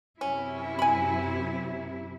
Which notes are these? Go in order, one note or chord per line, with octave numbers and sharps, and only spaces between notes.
F#2 C3 C#4 E4
G#5 B5